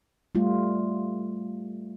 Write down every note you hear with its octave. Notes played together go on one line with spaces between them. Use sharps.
G3 A3 F4